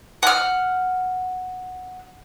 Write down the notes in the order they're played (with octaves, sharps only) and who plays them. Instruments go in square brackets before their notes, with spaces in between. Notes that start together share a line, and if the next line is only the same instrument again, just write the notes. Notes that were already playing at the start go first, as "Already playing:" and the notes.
[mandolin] F#5 F6